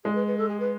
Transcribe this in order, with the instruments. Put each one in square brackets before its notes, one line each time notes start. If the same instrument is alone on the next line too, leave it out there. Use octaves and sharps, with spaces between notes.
[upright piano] G#3 [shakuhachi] G#4
[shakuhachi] B4
B4
A4
G#4
B4